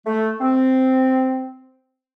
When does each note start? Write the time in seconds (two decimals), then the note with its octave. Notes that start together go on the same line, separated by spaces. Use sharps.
0.06 A3
0.41 C4